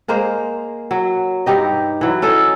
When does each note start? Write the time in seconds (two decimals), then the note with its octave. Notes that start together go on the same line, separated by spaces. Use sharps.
0.08 G#3 A#3 A#4 C5
0.91 F#3
1.46 G2 D#4 G4 D#5
2.01 E3 F#3
2.22 C#4 A4 D#5